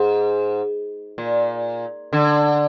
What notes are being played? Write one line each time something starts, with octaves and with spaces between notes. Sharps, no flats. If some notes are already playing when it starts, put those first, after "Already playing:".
Already playing: G#2
A#2
D3